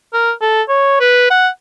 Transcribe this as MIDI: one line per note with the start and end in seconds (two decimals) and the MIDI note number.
0.14 0.31 70
0.42 0.62 69
0.69 1.00 73
1.00 1.28 71
1.30 1.48 78